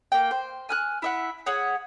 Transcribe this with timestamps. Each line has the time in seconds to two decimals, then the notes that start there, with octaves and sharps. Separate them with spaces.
0.12 A#3 G5
0.31 C5
0.69 G#5 F6 F#6
1.02 E4 E5 F#5
1.46 G#4 C#5 E5 F#5